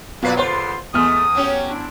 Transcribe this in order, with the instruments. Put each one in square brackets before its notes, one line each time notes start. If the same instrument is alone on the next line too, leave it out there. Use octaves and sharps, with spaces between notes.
[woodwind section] D#2 F#3 [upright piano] B2 F4 C7 [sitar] A#3 B4 D5
[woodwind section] E2 D3 C6 [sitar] F4 [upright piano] B4 C5
[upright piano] E2 F6 [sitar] G#3 A3 [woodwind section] D#6
[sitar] F#3 C#4 G4
[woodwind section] C4 D4 E4